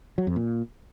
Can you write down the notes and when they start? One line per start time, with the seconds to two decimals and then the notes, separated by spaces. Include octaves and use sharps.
0.18 F#3
0.27 F2
0.36 A#2